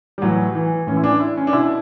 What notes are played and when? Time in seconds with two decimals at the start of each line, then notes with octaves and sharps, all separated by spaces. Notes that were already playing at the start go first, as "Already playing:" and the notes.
0.18 G3
0.22 A2 E3 F#3
0.55 E3
0.87 A2 E3 C#4
0.97 E4
1.04 D4
1.20 E4
1.37 C#4
1.47 D4
1.53 B2 E4